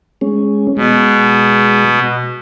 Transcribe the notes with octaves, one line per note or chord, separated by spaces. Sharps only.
G#3 C#4
B2 G#3